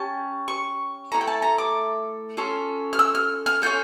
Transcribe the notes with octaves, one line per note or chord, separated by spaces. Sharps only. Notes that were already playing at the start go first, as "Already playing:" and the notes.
Already playing: C#4 G4 A5
C#6
A3 C#4 E4 A4 A#5
G5
A5
A#5
D6
C#4 F4 A4
F6
E6
F6
F6
C#4 F4 A4 G6